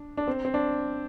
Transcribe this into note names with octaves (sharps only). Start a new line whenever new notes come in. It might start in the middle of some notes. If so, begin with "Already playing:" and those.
Already playing: D4
D4
C4
C4
D4